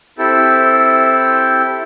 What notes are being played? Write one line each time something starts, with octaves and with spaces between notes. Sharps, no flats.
C4 E4 G4 A4